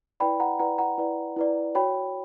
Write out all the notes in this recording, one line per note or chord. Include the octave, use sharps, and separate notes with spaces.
E4 B4 D5 G5 B5
F#5 A#5
E4 B4 D5 F#5 A#5
F#5 A#5
E4 B4 D5
E4 B4 D5
F#4 C#5 G5 B5